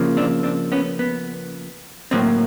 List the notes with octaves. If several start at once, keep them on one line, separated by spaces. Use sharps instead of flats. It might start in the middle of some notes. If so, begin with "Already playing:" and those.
Already playing: C#3 F3 A#3
C4 D4
C4 D4
B3 C#4
B3
A2 F#3 A#3 C4